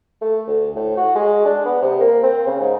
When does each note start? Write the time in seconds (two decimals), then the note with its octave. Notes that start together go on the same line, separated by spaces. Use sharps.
0.21 A3
0.47 D2
0.75 A2
0.97 F#4
1.15 G#3
1.45 D4
1.65 B3
1.82 C3
2.00 A#3
2.23 C4
2.46 C#3
2.60 G#2